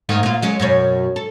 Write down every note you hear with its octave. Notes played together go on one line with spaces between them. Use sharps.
G#2 D#3 A3
A#2 F4
F#3 G#3 C#4
F#2 B2 C#5
A4